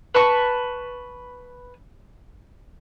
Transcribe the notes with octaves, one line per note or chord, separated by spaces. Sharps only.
B4 A5 C#6